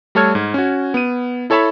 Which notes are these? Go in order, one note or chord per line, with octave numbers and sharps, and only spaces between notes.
G3 A3 A4 C#5 F6 G#6
G#2
C#4 F#4
B3 D#7
E4 A4 C#5 E5 A5 B5